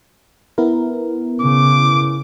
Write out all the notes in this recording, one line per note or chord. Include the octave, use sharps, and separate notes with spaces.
B3 E4 A#4
C#3 D6